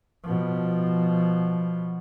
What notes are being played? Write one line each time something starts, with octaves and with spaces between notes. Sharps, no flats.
B2 F3